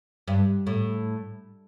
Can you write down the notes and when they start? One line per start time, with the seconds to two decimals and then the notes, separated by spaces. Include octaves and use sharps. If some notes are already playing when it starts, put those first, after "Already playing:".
0.28 G2
0.67 A2